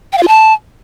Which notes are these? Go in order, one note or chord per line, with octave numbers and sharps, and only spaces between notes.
G5
F5
F4
A5